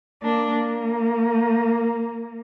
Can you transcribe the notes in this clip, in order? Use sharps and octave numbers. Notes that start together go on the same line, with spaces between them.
A#3 D4
A#3